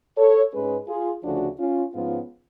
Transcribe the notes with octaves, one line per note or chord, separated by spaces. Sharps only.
A4 C#5
G#2 G#3 C#4 G#4 B4
F4 G#4
D2 C#3 F3 A3 C#4 D4 F#4
C#4 F4
G#2 F3 B3 C#4 F4